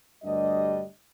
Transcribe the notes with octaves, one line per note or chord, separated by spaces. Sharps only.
D2 G2 G3 D4 D#5